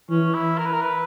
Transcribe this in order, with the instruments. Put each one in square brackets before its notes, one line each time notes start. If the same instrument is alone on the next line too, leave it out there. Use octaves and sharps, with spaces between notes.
[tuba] E3 [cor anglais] C#4
[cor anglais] E4
A#4
B4
A#4
B4